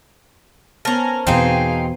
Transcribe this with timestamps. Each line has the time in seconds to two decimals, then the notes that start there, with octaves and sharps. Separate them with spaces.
0.85 B3 C#4 A#4 C5 A5
1.27 E2 B2 C4 D#4 G#4 B4 F5